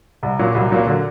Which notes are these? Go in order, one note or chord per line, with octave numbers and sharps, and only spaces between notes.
C2
A#2 F#3 A#3
C2
A#2 F#3 A#3
D3